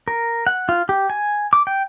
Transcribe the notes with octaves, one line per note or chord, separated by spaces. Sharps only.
A#4
F#5
F4
G4
G#5
D6
G5